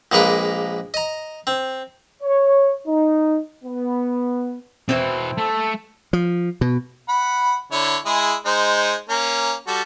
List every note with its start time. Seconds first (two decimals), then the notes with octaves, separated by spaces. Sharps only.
0.12 A#1 G#3 A#3 B4 A#5 D6
0.94 D#5 A#5
1.47 C4
2.23 C#5
2.87 D#4
3.64 B3
4.89 B2 E3 C4 E4 C5
5.38 A3 A4
6.13 F3
6.61 B2
7.09 F#5 B5
7.72 D3 E4 C#5
8.05 G#3 E4 G#4
8.46 G#3 D#4 C5
9.09 A#3 C#4
9.67 G3 F#4 A4